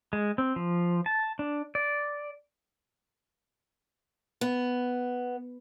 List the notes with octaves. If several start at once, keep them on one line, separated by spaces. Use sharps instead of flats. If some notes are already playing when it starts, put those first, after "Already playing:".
G#3
C4
F3
A5
D4
D5
B3